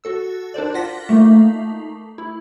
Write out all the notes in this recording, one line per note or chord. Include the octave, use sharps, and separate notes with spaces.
F#4 A4 E6
D4 A#4 C5 D5
F4 F#5 A#6 B6
A3 A#3 D#4
E4